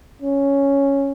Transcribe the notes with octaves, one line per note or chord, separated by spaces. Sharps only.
C#4